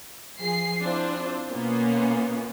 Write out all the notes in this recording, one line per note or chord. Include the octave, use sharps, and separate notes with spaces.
F3 G#4 C7
C4 D4 E4 F4 C5
B2 A#3 B3 C#4 F4